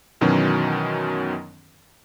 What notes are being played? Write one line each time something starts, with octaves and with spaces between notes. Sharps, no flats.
F#2 B2 D#3 E3 F#3 C#4